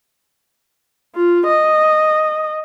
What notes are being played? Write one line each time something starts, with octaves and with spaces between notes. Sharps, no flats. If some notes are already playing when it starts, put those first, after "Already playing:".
F4
D#5